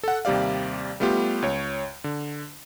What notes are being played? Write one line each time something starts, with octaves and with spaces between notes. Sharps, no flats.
A4 F#5
D#2 C3 G3 G4 D5 F5
G3 A3 B3 F4 G4
C#2 C#5
D3